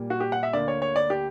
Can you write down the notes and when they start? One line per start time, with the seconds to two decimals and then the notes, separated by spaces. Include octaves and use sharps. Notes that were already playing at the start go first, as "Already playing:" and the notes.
Already playing: A#2 G3 A#3
0.10 F#4
0.20 G4
0.32 F#5
0.43 E5
0.53 D2 D3 A#3 D5
0.68 C#5
0.82 C#5
0.96 D5
1.10 G4